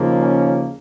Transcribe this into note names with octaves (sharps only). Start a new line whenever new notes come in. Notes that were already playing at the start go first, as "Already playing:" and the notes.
Already playing: D#2 C#3 F3 A#3
C#4